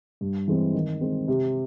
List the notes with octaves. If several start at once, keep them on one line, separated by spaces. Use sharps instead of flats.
G2
E3 G#3 C4
D#3
G#3 C4
C3